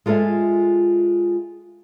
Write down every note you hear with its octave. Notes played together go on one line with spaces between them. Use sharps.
G#3 F4 A4 B4 E5 G#5